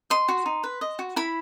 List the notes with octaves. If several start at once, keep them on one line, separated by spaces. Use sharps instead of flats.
D#5 C6
F#4
D#4
B4
D#5
F#4
E4 B5